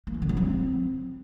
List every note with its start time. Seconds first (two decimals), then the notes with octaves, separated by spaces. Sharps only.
0.07 A#3
0.14 E3
0.22 D3
0.29 F#3
0.37 C4